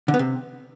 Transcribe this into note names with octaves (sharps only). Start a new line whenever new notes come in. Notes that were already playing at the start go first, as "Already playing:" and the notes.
D3
B3
C3